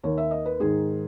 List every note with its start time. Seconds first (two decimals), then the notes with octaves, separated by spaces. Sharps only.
0.03 D#2 D#3 C#5
0.18 E5
0.31 D#5
0.46 B4
0.60 G#2 D#3 G#4